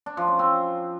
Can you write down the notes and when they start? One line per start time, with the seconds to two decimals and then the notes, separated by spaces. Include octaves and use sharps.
0.06 D4
0.17 F3
0.28 C#4
0.39 C4